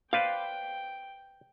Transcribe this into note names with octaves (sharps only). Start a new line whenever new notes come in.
B4 C5 D5 F5 G5